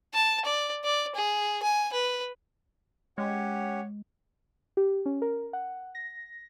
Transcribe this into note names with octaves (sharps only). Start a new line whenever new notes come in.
A5
D5
D5
G#4
G#5
B4
G#3 C#4 G4 C#5 F#5
G4
C#4
A#4
F#5
A#6